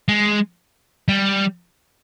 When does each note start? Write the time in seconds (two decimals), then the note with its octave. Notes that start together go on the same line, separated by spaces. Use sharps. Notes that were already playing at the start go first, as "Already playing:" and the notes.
0.08 G#3
1.08 G3